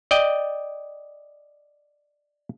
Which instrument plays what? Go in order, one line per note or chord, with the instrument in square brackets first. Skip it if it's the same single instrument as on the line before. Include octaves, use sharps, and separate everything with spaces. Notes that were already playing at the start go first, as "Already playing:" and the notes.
[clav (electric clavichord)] D5 D#5 G5